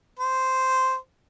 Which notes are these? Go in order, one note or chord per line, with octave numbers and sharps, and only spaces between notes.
C5